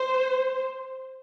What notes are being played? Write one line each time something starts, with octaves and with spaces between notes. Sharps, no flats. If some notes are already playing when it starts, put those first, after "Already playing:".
Already playing: C5